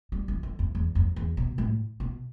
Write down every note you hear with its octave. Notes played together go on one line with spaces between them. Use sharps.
G3
E3
D3
F2
E2
F2
E2
B2
A2
B2